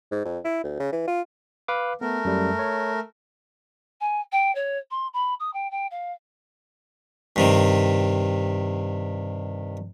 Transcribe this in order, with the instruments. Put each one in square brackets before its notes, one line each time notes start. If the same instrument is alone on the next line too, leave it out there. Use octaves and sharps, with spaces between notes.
[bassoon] G#2
F2
E4
D2
C#3
E3
F4
[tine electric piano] B4 F5 D6
[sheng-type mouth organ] A3 A#4 [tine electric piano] B3
[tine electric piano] F#2 G3
C#5
[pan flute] G#5
G5
C#5
C6
B5
D#6
G5
G5
F5
[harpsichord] G2 C3 D#3